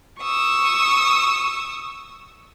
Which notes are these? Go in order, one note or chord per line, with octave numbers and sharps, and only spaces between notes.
C#6 D#6 E6